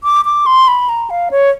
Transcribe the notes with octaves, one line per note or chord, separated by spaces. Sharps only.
D6
D6
C6
B5
A#5
F5
C#5